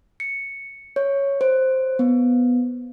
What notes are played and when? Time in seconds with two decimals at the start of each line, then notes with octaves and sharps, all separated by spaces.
0.20 C#7
0.96 C#5
1.41 C5
1.99 B3